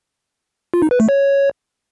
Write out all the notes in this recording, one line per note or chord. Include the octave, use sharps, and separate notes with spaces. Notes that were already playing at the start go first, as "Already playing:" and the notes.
F4
D#4
B4
A3
C#5